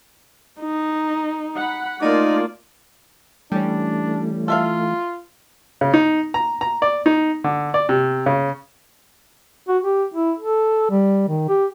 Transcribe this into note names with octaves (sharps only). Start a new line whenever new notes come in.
D#4
F#5 B5
A3 A#3 D#4 F4 D5
E3 G3 A3 C#4 D4
F4 A4 E5 F5
C#3
D#4
A#5
A#5
D5
D#4
D3
D5
C3
C#3
F#4
G4
E4
A4
G3
D#3
G4